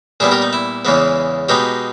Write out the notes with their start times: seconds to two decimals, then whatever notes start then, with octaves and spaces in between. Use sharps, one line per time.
0.20 A#2 G3 B3 E4 G#4
0.31 G4 A#4
0.42 D#4
0.53 E4
0.85 E2 C#3 E3 G#3 B3
1.49 B2 G#3 B3 D#4 G4